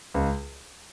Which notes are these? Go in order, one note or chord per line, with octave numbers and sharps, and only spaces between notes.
C#2